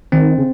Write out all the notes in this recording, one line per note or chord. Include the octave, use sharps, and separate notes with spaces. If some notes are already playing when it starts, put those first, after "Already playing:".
D#3 C4
C#3